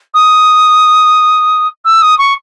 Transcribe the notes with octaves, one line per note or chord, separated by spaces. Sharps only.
D#6
E6
D#6
C#6